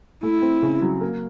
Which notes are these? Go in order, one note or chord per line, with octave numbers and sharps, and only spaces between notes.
A3 E4
C4
C#3
F#3
A#3